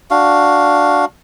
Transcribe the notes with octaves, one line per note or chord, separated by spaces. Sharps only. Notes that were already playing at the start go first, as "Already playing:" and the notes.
D4 F#4 F5